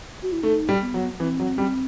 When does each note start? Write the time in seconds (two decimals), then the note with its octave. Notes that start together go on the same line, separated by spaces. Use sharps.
0.23 F#4
0.32 E4
0.43 A3 D#4
0.69 G3
0.81 B3
0.94 F#3
1.20 E3 C4
1.40 F#3
1.58 G3